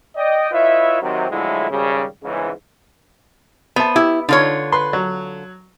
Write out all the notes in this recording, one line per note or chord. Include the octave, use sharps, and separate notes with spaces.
D5 D#5 G5
E4 F4 B4 C#5 D#5 E5
C3 D#3 F#3 C4
A2 D3 F3 F#3 G#3 E4
G#1 C#3 G3
G1 G#2 C#3 E3
B3 C5 E5 A5
E4 G4
D3 D#4 F4 C#5
B4 C6
F#3